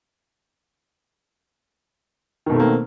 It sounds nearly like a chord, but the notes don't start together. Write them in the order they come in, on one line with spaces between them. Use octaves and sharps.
D#3 B2 A3 C4 A#3